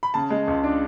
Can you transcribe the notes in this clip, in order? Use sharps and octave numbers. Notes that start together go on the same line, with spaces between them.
B5
C#3 A5
G#3
C#2
D4